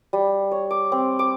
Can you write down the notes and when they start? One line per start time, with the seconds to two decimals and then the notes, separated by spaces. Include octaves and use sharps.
0.13 G3
0.51 C#5
0.71 D6
0.92 C4
1.19 D6